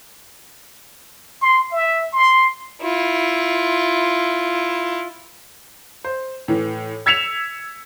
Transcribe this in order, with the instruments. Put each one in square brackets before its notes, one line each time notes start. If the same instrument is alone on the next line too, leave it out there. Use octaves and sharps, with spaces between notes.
[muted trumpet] C6
E5
C6
[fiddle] E4 F4
[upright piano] C5
A2 E3
E6 G#6 B6 C#7 E7 F7